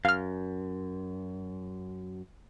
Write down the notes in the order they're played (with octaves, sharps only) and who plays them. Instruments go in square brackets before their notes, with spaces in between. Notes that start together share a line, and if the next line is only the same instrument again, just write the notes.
[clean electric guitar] F#2 [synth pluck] F5 F6